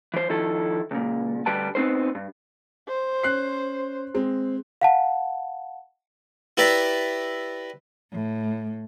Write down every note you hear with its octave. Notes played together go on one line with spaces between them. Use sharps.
E3 C5
D#3 F3 E4 A4
C#2 A#2
D2 G3 B4 G5 A5
B3 C4 D#4 A#4 C5
G2
C5
C#4 F#6 C7
G#3 C4
F5 F#5 A5
E4 G4 B4 D5 E5 A#5
A2